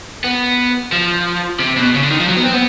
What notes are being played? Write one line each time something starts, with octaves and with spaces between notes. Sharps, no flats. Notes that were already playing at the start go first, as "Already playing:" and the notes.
B3
F3
C3
B2
C#3
D3
D#3
F3
F#3
B3
C4
B3